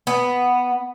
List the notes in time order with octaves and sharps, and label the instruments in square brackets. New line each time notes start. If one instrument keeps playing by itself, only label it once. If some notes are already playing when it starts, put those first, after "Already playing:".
[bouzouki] B3